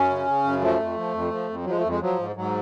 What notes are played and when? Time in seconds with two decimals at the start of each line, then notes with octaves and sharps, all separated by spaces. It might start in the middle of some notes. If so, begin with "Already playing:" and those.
Already playing: F#2 C#4
0.10 C#3
0.27 C#3
0.44 F#2
0.61 F3 A3
0.79 F2
0.96 F3
1.14 F2
1.31 F3
1.49 F2
1.64 F#3
1.67 F3 G#3
1.78 A3
1.84 F2
1.89 G#3
2.01 F3 F#3
2.18 G#2
2.36 G#2 F#3